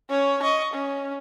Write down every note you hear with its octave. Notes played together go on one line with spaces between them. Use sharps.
C#4 C#5
D#5 C#6
C#4